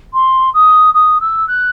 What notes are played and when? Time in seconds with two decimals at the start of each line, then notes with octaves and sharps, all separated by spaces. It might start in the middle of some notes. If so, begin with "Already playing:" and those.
0.13 C6
0.54 D#6
0.94 D#6
1.20 E6
1.47 F#6